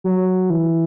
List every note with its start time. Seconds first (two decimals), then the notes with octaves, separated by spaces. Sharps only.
0.04 F#3
0.50 E3